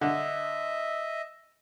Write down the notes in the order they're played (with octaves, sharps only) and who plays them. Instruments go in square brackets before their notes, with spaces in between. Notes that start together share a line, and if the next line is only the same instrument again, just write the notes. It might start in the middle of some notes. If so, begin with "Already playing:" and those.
[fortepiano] D3 [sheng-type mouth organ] D#5 E5